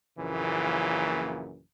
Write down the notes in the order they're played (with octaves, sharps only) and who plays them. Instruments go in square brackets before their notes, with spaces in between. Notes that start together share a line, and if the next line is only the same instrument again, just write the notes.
[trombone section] A#1 F#2 A#2 C#3 E3